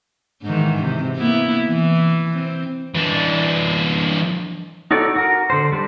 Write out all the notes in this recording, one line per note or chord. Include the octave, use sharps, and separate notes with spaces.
G#2 D#3 E3
C3
A#3 B3 E4
E3
C4
E3 D4
D#4 F#4 A4 C#5 D5
F#4 A#4
D3 C5
G3 D4 C5